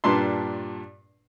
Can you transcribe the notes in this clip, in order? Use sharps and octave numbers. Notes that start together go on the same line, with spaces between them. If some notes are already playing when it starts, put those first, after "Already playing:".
G2 A#2 D4 A5 C6